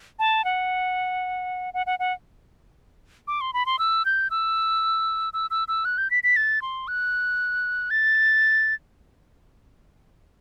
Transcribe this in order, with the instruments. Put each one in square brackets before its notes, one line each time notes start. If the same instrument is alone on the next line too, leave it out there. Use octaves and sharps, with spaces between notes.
[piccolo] A5
F#5
F#5
F#5
F#5
D6
C6
B5
C6
E6
G6
E6
E6
E6
E6
F#6
G6
B6
B6
A6
C6
F#6
A6